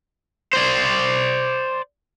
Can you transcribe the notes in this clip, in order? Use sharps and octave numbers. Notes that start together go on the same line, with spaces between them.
C5 D5